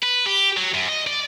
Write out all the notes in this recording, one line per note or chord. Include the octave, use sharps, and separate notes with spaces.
B4
G4
F#3
F#2
D#5
D5